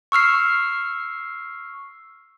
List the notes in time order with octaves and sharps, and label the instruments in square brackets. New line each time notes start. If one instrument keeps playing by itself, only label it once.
[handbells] C#6 E6 F6 C7